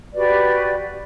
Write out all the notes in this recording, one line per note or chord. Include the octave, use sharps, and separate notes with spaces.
F#4 G4 B4 D5